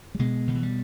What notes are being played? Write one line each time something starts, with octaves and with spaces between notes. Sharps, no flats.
G3
B2 G#3
B2 D#3
E3
G3